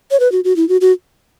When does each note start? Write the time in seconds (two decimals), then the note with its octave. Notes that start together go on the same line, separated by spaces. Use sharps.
0.11 C#5
0.20 B4
0.32 F#4
0.44 F#4
0.56 E4
0.69 F#4
0.81 F#4